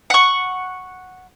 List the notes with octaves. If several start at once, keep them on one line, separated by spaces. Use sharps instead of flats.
F#5 C#6